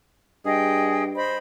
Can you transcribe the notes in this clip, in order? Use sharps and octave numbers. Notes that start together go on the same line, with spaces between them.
G2 G#4 D#5 G5
C5 D#5 B5